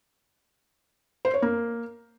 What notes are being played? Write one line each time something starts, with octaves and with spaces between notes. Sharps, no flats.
C5
C#5
A#3